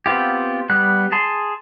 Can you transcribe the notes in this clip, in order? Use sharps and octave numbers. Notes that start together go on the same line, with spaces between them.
B3 C4 F4 G4
G3 B3 F#6
G#4 A5 C6